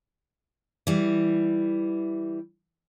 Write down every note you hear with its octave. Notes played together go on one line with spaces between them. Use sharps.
E3 G3